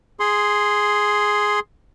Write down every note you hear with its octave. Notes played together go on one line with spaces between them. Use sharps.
G#4 C6